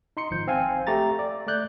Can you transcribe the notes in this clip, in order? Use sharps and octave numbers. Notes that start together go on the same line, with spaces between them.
D#4 C6 C#7
G#1 F3 G6
C4 F5 G#5
A3 G4 A#5 A6
D5
A3 D5 F#6 G6